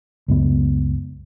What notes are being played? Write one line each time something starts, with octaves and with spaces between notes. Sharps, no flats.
C#2 F#2 B3